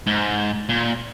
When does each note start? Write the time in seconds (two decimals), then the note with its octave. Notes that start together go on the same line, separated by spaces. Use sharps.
0.07 G#2
0.69 A#2